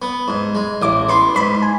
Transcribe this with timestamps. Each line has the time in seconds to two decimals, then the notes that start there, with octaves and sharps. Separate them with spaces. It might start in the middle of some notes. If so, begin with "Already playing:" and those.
0.02 B3
0.28 G#2
0.55 G#3
0.82 A1 D6
1.09 B3 C6
1.35 G#2 B5
1.62 G#5